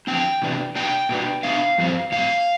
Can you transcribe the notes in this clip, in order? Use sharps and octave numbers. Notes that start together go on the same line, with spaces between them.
E2 D3 F3 C4 G5
C3 E3 B3 D4
B2 B3 D4 G5
B2 B3 D4
B2 B3 D4 F5
G2 F3 C4
A2 G3 C4 F5